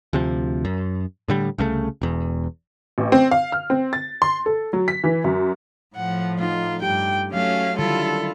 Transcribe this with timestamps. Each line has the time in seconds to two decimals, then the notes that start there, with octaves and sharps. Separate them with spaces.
0.13 D2 C3 F3
0.65 F#2
1.28 A2 D3 G3
1.58 C2 C#3 G#3 A3
2.02 E1 E2
2.98 A1
3.12 C4
3.31 F5
3.52 F6
3.70 C4
3.93 A6
4.22 C6
4.46 A4
4.73 F#3
4.88 B6
5.04 E3
5.24 F#2
5.96 A2 F3 F#5
6.39 A3 D#4 F4
6.82 G2 G4 G5
7.34 F#3 A3 C#4 F5
7.79 D3 D#3 G3 E4 F4 A4